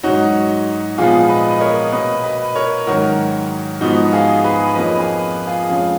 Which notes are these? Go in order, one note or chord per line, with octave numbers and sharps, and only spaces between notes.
G#2 F#3 C#4 D#4 F#4
A#2 F3 G#3 B3 F4 G#4
B4 D#5
D#5
A#4 C#5
B2 A#3 C#4 B4 D#5
B4 D#5
A#4 C#5
G#2 D#3 F#3 C#4 F#4 A#4
G#2 F3 B3 D#4 F#4
F4 G#4
G#4 B4
F2 F3 A#3 C#4 B4 D#5
G#4 B4
F4 G#4
F2 C#3 G#3 C#4 F4